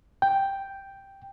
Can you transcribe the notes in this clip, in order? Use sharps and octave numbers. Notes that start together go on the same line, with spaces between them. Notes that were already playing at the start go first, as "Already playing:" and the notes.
G5